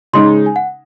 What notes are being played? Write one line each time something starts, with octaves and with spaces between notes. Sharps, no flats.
C#3 G#3 D#4 C6
G#5
F#5